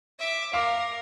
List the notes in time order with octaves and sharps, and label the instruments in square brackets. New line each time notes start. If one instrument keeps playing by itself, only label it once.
[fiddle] E5 D6
[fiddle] A#4 [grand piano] F5 D6